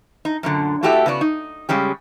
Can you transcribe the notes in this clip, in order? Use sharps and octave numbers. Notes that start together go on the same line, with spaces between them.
D#4
F#2 A#2 D3
A3 E4 F#4 G4 A4 E5
C#3 B3 F#4 D5
D#4
C#3 G3 G#3 C#4 G4